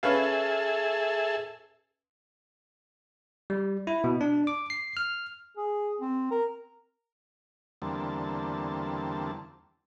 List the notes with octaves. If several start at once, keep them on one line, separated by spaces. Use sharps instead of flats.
C#4 G#4 A4 B4 E5 F5
G3
E4
B2
D4
D6
C7
F6
G#4
C4
A#4
E2 D3 G3 A#3 C4 A5